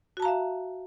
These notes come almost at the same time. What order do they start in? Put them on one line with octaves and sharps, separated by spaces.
F#4 A5 A#5 F5 E5